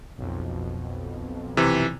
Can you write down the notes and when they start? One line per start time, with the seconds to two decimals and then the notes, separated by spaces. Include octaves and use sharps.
0.18 B1 F2
1.57 C3 E3